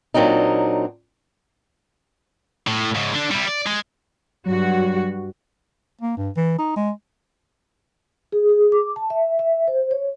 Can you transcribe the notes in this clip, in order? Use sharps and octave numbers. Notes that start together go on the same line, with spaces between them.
A#2 F#3 C4 D4 D#4
A2
G#2 C#3
D3 D4
G3 E4
D5
G#3
G2 F#3 F#4
A#3
G2
E3
D#4
G#3
G#4
G#4
D6
A5
E5
E5
C5
C#5